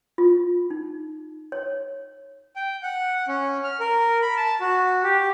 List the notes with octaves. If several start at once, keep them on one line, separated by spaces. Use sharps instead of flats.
F4
D#4
C#5
G5
F#5
C#4
F6
A#4
B5
A5
F#4
G4